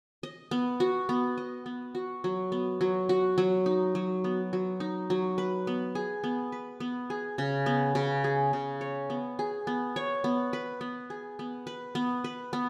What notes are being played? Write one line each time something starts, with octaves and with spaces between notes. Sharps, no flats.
D#5
B3
F#4
B3
D#5
B3
F#4
F#3
B3
F#3
F#4
F#3
D#4
F#3
B3
F#3
D#4
F#3
B4
B3
G#4
B3
B4
B3
G#4
C#3
B3
C#3
G#4
C#3
C#5
B3
G#4
B3
C#5
B3
B4
B3
G#4
B3
B4
B3
B4
B3